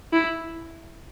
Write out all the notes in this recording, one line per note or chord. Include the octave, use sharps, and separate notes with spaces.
E4